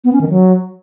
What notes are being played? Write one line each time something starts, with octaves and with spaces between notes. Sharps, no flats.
B3
C#4
D#3
F#3